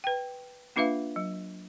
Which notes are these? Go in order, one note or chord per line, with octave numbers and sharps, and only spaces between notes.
B4 G5
A#3 D4 F4 B4 E5 F5
F#3